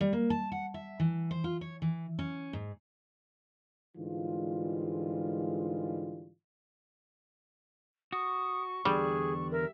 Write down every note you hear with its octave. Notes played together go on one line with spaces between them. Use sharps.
G3
A#3
A5
F#5
E5
E3
C5
F4
C#5
E3
C#4
G#2
G#2 D3 E3 G3 G#3 F4
F#4 C#6 D#6
E2 D3 G3 D4 G#4
A#4 E5